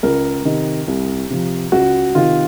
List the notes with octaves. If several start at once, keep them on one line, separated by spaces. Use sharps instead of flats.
C#2 A#4
C3 D#3
C2
C3 F3
C#2 F#4
C3 D#3 F4